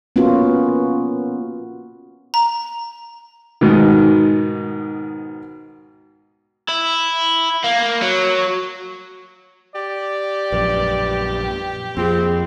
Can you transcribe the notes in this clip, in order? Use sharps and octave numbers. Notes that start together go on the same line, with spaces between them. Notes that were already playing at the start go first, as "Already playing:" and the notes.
A#3 B3 C#4 F4 F#4
A#5
G#2 B2 D#3
E4
A#3
F#3
G4 D5
A#1 F#2 A#2 B4
F2 A#3 C4 F4 G#4